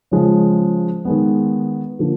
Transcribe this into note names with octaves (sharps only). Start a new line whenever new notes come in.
C#3 F3 G#3 C#4
D#3 G#3 B3
D3 F3 A#3